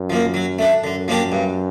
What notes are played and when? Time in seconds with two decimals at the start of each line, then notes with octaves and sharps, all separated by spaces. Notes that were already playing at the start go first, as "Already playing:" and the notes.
Already playing: F#2
0.10 F3 A#3
0.34 F#3
0.59 A3 D4
0.84 F#2 D3
1.08 F3 A#3 D4 G4
1.32 G2